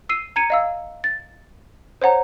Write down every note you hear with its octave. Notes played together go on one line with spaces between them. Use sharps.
E6 C7 D#7
A#5 G#6 C#7 D#7
D#5 F5 E6
A6
C5 C#5 F#5 A#5